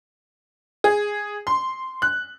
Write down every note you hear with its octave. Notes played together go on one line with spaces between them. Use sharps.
G#4
C6
F#6